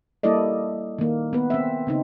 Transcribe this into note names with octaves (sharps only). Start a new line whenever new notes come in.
G3 A#3 E4 A4 D5 D#5
D#3 A#3
B3 B4
C4 E5
C#3 C4 D#4